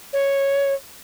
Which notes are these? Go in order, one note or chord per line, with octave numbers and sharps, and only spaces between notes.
C#5